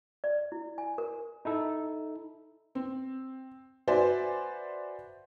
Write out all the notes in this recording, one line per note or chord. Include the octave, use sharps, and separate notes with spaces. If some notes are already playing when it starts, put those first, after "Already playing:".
D5
E4
G#5
A#4
D#4 E4 A4
C4
F#4 B4 C5 D5 E5 G#5